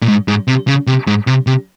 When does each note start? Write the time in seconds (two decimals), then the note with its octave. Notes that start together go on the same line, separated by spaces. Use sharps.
0.02 A#2
0.08 G#2
0.28 G#2
0.48 C3
0.68 C#3
0.87 C3
1.07 G#2
1.27 C3
1.47 C3